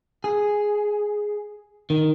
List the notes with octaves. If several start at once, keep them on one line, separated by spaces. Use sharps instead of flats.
G#4
D#3